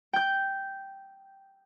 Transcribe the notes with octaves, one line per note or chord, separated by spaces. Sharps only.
G5 G6